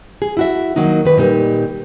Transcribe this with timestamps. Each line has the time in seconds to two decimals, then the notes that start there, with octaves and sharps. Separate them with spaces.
0.22 G#4
0.37 E4 F#4 E5
0.76 D#3 F#3 A#3 D#4
1.05 D#3 B4
1.17 A#2 G3 D#4